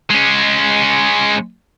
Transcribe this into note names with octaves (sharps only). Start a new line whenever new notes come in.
G#3 C#4